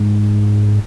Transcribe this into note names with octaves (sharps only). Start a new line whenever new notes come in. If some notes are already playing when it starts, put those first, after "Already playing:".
Already playing: G#2